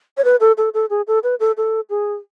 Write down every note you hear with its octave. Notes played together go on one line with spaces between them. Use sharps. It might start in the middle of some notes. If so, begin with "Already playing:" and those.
C#5
B4
A4
A4
A4
G#4
A4
B4
A4
A4
G#4